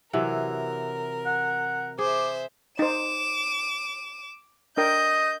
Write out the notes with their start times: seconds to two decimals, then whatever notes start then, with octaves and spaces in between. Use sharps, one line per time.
0.13 C3 E3 F#3 A#4
1.26 F#5
1.99 G#4 C5 E5 D6
2.79 D#4 C5 D6 E7
4.77 D4 A#4 D#5 G5 G6